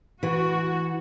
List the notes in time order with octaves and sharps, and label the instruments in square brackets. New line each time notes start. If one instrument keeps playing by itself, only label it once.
[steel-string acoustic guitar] E3 [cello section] F#4